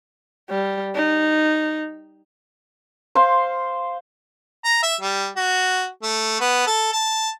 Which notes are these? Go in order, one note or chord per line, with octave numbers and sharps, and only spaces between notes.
G3
D#4
C5 F5 C6
A#5
E5
G3
F#4
A3
B3
A4
A5